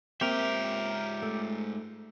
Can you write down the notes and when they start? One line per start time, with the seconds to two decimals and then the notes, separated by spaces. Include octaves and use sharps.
0.21 G#2 A#3 C4 G4 A#4 E5
1.23 A3